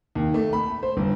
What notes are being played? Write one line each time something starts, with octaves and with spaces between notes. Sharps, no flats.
D#2
A3
B5
C5
G1